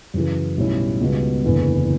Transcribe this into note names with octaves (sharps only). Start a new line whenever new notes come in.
F#2 C#3 E3
B1 A2 G3 C#4 E4
C#2 B2 G3 B3
F#1 E2 D3